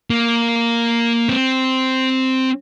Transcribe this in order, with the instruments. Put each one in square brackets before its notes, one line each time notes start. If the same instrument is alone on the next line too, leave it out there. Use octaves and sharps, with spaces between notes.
[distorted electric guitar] A#3
C4